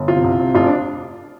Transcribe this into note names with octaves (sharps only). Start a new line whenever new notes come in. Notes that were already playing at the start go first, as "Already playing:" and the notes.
Already playing: G1
C3 F4
C2
C3
F1 F4
D4